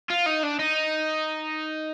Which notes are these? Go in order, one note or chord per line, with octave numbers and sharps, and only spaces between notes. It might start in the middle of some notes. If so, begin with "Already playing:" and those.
F4
D#4
D4
D#4